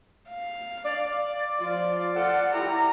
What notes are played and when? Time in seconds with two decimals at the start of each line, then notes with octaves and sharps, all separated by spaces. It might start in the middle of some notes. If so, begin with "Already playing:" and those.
0.30 F5
0.85 D5
1.60 F3 F4 D5
2.15 F4 A4 D5 F#5
2.53 E4 G4 A#5